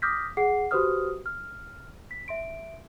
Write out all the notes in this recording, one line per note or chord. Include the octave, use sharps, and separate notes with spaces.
D6 D#6 F6 G6 A#6 B6
G#4 F#5 C7
F#4 G4 B4 C5 D#6 F6
F6
B6
E5 C6 D7